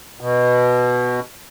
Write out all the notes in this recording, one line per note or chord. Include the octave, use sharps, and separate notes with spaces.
B2